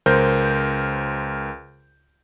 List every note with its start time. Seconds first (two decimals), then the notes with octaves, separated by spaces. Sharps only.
0.06 C#2 A#4 C5 G6